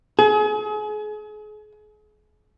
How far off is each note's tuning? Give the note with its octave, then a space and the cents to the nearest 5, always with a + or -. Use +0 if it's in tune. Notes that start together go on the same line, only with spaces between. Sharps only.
G#4 +35